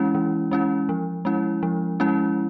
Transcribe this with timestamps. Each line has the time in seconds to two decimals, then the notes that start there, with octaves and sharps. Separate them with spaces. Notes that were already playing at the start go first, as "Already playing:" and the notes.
Already playing: E3 G#3 C#4 E4
0.15 E3
0.51 G#3 C#4 E4
0.89 F3
1.25 G#3 C#4 E4
1.63 F3
2.00 G#3 C#4 E4